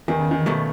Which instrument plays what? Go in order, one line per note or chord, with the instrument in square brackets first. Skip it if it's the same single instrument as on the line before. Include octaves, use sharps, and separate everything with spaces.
[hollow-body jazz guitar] E2 [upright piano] D#3
[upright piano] C#3
D#3
[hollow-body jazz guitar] B2 F#3 A3